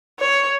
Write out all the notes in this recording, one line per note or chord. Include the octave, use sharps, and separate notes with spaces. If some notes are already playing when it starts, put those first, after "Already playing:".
C#5